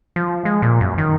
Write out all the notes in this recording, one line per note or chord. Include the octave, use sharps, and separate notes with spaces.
F3
G#3
A#2
F#2
D#3